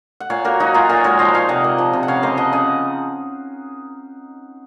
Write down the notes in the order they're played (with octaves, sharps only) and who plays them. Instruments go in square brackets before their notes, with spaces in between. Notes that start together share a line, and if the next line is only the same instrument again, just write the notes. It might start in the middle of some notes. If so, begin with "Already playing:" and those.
[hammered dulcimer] F#5
A#2 C#5 F5
A#3 F#4 A#4
F#3 D#4 F#4
A#2 F4 G#4
A#2 F#4 A#4
G#3 A#4 C#5
F3 C5 D#5
A#2 C#5 F5
C3 D#5 F#5
A#3
F3
C3
F#5
C#3 C#5 F5
A#3 C5 D#5
F3 D#5 F#5
C#3 D#5 F#5